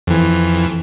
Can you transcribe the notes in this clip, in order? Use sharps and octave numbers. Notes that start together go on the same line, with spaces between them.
F2 E3